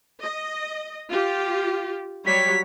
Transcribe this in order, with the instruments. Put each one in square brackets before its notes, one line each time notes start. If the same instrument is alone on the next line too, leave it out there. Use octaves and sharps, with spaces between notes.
[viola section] D#5
F4 G4
[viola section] F#3 G3 C#5 [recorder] B6